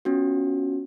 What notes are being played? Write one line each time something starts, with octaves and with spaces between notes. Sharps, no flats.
B3 C#4 F4 F#4